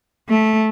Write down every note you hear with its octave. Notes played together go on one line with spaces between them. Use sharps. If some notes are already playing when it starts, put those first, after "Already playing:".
A3